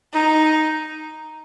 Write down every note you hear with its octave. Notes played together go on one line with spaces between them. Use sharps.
D#4